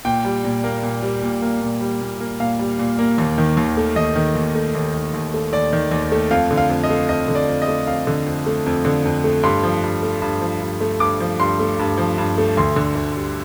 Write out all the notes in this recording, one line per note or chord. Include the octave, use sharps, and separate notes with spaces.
A#2 G5
G3
A#2
A#3
A#2
G3
A#2
A#3
A#2
G3
A#2
A#3
A#2 F5
G3
A#2
A#3
D#2
D#3
D#2
A3
D#2 D#5
D#3
D#2
A3
D#2
D#3
D#2
A3
D#2 D5
D#3
D#2
A3
F2 F5
D3
F5
F2
D#5
A3
F2 D#5
D3
D5
F2
D#5
A3
F2 F5
D3
F2
A3
F2
D3
F2
A3
G2 C6
F3
G2
A3
G2
F3
G2
A3
G2 D6
F3
G2 C6
A3
G2
F3
G2
A3
D2 C6
D3
D2
G3